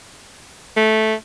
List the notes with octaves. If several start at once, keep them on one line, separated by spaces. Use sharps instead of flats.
A3